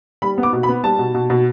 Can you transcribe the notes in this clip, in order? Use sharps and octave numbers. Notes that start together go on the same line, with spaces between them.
G3 B5
B3
D6
B2
B5
B3
G3 A5
B2
B2
B2